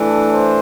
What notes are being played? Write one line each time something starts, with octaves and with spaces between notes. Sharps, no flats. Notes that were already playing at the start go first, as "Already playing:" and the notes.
Already playing: E3 A3 D4
C5